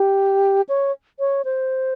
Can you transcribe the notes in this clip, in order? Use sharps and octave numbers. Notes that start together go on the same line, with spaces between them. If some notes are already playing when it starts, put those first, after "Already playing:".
Already playing: G4
C#5
C#5
C5